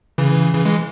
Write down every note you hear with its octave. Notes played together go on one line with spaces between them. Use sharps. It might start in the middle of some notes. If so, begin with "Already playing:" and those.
C#3 E3
C#3 E3
E3 G#3